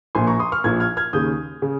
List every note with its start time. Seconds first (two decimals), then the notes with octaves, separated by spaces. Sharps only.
0.15 A#1 A#2 G#5 C6
0.27 A#5 C#6
0.39 C6 D#6
0.52 C#6 F6
0.64 A#1 A#2 F6 G#6
0.80 F6 G#6
0.97 F6 G#6
1.13 D#2 C#3 D#6 G6
1.62 C#3